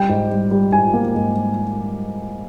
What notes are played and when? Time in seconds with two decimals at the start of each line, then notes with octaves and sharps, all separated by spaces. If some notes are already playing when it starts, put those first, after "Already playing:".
Already playing: G3 G5
0.09 G#2
0.31 G3
0.51 G3
0.72 G#2 G#5
0.93 A#3
1.15 G#2